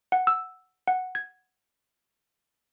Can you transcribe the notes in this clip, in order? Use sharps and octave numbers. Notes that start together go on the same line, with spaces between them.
F#5
E6
F#5
G#6